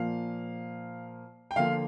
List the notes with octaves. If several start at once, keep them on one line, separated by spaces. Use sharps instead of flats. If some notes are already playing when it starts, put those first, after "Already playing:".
Already playing: A#2 F3 A#3 F5
G5
D3 F3 A#3 F4 F5